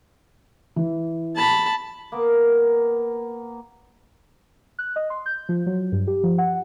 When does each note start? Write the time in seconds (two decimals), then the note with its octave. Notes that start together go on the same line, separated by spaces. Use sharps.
0.76 E3
1.36 A5 B5
2.12 A#3 B3 A#4
4.79 F#6
4.96 D#5
5.10 C6
5.26 G6
5.49 F3
5.66 F#3
5.92 G2
6.07 G4
6.23 F3
6.38 F#5